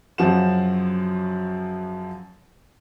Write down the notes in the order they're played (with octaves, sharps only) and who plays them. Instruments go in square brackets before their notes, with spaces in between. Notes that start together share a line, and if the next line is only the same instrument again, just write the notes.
[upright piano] F#2 C#3 F3 F#3 F#5 E7